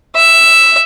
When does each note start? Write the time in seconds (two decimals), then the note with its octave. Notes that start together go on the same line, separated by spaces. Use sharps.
0.16 E5